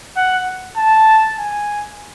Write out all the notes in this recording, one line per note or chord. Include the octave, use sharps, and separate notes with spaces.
F#5
A5
G#5